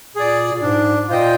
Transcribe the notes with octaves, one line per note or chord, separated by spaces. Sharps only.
A#2 G#4 D5
A#2
G#2 D4
A#2 F4 C5 D#5 G5